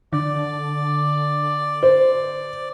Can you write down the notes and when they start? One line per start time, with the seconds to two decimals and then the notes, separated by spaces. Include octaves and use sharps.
0.13 D3 D5
1.83 C5